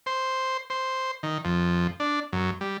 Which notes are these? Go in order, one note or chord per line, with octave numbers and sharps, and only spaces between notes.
C5
C5
D#3
F2
D4
F#2
G3